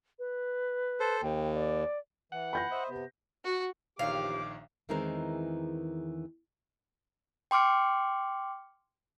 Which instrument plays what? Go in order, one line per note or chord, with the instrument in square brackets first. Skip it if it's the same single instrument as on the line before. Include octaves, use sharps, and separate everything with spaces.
[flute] B4
[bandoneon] A4 C5
[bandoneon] D#2 [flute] G5
[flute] D5
[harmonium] E3 [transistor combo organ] F#5
[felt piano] B5 G6 A#6
[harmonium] C5 D#5 E5
C3 B3
[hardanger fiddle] F#4
[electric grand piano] A#1 D#3 C#5 [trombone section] E2 F3 G4 [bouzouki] F5 [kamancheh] D6
[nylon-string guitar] E2 D#3 E3 G#3 C4 A#4
[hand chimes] G5 C6 D6 F6 C#7